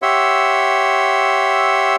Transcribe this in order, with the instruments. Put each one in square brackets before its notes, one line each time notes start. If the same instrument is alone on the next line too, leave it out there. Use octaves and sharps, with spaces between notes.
[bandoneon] G4 C#5 E5 F#5 C6 E6